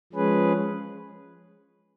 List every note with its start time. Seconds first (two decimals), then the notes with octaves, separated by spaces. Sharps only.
0.13 F3 G#3 C#4 G#4 B4